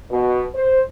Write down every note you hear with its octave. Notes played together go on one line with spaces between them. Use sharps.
B2
C5